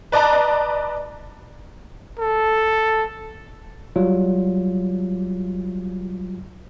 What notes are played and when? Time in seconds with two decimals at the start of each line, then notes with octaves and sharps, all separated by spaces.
0.12 B4 D5 D#5 A5 A#5
2.19 A4
3.96 F#3 G3 F4